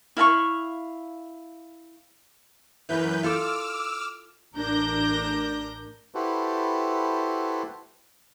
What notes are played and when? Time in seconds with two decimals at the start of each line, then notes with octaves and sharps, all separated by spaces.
0.17 E4 F5 G#5 C#6
2.89 F#2 E3 A#4 B4 G6
3.23 F4 A4 D6 E6 F6
4.57 A1 D4 A#4 G6 A#6
6.15 E4 F#4 G4 A4 B4 C5